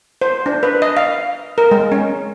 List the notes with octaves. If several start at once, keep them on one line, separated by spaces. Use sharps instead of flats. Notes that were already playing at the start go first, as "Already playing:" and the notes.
C5
D4
B4
D#5
F5
A#4
G#3
C#4